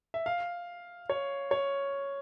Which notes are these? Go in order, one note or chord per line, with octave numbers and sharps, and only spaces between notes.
E5
F5
C#5
C#5